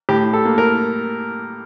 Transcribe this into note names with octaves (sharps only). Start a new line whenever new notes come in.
A2 G4
A4
A#3
A#4